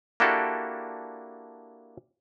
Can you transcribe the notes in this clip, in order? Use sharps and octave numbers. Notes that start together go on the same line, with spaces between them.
A#3 D4 E4 F#4 G4 A4